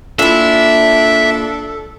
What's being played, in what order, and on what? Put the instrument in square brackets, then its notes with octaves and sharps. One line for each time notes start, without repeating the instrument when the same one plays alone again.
[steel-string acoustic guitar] A#2 E4 [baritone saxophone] D4 [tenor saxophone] A4 [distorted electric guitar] E5